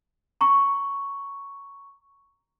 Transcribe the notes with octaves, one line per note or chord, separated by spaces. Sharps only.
A#5 C#6